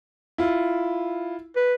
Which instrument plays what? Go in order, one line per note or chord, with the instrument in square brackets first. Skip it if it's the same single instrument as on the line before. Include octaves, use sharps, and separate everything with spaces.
[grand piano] E4 F4
[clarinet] B4